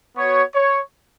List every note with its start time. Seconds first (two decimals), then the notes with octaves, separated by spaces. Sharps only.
0.17 B3 F#4 C#5
0.54 C#5